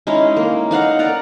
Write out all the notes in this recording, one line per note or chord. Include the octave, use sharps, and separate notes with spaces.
G#3 C#4 D#4 E4
A#3
D#4 F5 F#5 A#5
D5 F#5 A#5